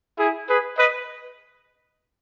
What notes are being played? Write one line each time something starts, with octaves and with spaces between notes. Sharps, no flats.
E4 G#4
G#4 B4
B4 D#5